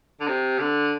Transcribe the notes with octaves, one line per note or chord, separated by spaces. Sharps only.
D3
C3
D3